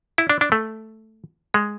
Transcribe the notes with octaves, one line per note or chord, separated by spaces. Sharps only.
E4
D4
D4
A3
G#3